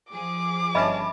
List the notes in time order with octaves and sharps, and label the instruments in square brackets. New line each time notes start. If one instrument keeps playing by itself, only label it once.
[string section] F3 G#4 [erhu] D6
[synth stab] G1 C#4 A5 [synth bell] D#5 E5 B5